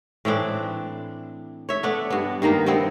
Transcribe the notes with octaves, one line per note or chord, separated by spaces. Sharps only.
A2 E3 C4 D4
C#5 E5
A3 B3 D4
G2 B3
G2 D#3 A#3 D#4
G2 B3 C4 E4